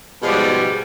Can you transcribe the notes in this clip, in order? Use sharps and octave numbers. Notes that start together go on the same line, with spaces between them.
G#2 B2 F3 G3 G#3